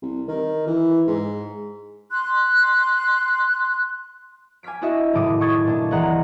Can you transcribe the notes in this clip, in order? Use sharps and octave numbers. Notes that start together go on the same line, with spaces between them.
C2
D#3
E3
G#2
C6 F#6
G#5 D6 F6 B6 D7
D4 E4 F#4 D#5 E5
F#1 A2 D#3 A4 D6 D#6
C#6 D#6 G#6 A6
A#2 A3 D4
C2 E3 G#4 D#5 F#5 A#5